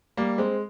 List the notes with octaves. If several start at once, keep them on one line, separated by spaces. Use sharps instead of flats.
G3 A#3
G#3 C4